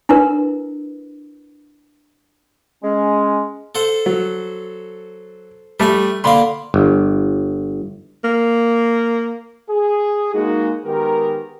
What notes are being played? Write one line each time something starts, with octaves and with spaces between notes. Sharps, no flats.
D4 E4 A#4 B4
G#3 C#4
A4 C5 F#5
F#3
G3 A3 B4 G#5
D3 A#3 F5 B5 C6
G1
A#3
G#4
G#3 A#3 D#4 F#4
D#3 G#3 B3 G4 A#4